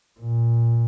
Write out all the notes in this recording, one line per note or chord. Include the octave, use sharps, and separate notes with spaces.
A#2